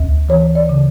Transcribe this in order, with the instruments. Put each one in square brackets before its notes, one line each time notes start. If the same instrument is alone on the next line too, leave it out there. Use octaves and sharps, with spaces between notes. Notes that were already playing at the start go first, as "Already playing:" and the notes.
Already playing: [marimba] D2
E3 C#5
D5
C#3